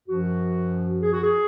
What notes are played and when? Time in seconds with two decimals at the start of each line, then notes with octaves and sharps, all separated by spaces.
0.08 F#2 F3 F#4
1.01 G#4
1.12 F#4
1.23 G#4